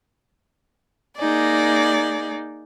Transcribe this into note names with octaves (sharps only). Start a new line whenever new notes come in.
A#3 D#4 G#4 D5